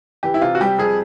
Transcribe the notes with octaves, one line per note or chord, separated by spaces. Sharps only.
E3 G4
E4
C3 F4
F#4
G3 G4
F2 G#4